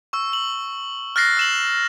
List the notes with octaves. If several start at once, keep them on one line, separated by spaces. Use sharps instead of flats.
C#6 E6
F#7
F6 F#6 A6 A#6 C7
E6 E7 F#7